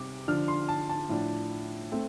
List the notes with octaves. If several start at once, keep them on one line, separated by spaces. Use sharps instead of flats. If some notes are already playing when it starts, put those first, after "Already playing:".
Already playing: C3 G3 D6
D3 F3 D4 F6
C6
A5
A5
A2 F3 D4
A3 C4